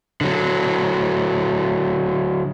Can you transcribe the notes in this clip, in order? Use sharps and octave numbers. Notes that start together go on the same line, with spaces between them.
D3 F#3